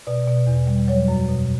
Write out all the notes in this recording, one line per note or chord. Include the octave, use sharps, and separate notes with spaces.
B2 D5
B2
E2
G3
F#3 C#5
F#2
B2